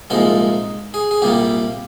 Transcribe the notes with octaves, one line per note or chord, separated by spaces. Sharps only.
C2 A#2 F3 G#3 D#4
G#4
G#4
C2 A#2 G3 A#3 G4